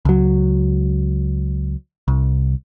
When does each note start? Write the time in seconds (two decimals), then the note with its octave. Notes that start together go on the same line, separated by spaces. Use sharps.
0.05 C#2 F#3
2.08 C2